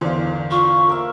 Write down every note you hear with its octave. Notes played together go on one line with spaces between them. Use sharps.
G1 E2 E3 C5 D5 F5
F4 C#6
A#3 A#4 E5